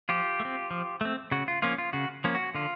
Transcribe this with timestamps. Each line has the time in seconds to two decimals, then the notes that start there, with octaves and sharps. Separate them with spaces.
0.09 F3 F4 G4
0.40 A3
0.45 C4
0.71 F3
1.01 A3 C4
1.31 C#3 F#4
1.48 F4
1.62 F3 A#3 C#4 F4
1.78 F4
1.93 C#3 F#4
2.24 F3 A#3 C#4
2.35 F#4
2.55 D3 F4